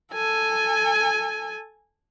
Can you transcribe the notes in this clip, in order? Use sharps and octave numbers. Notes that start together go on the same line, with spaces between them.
A4 G#5